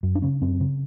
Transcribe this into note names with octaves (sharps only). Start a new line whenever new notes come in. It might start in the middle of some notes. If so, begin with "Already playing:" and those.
F#2
D4
C#3 C#4
F#2 C4
C#3